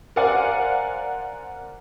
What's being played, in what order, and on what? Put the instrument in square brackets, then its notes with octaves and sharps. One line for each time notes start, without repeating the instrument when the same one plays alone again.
[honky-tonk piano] A#4 C5 D5 F5 F#5 G#5